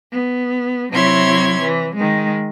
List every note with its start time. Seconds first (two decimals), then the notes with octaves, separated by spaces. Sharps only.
0.13 B3
0.91 C3 F#3 E4 C#5 C6 G#6
1.61 E3
1.95 D#3 G#3